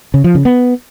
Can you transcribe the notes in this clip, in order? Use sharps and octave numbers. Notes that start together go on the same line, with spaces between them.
C#3
F3
C#3
B3